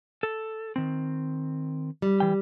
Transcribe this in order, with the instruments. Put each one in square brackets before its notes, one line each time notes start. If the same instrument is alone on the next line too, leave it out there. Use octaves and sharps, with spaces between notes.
[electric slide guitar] A4
D#3 C4
[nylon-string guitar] G3
[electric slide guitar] E3 G5